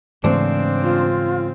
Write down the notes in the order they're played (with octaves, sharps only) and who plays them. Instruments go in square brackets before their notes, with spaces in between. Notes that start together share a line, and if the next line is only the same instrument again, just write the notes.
[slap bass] G#2 E3 A3 [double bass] C#3 C4 [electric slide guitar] D4 C5
[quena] F4